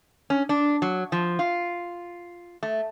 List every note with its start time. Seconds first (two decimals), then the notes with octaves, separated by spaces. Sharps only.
0.30 C#4
0.49 D4
0.82 F#3
1.12 F3
1.39 F4
2.63 A3